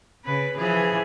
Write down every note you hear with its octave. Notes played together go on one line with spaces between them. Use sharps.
C#3 B4
E3 F3 G#4